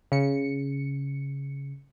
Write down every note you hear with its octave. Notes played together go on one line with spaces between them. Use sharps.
C#3 C#7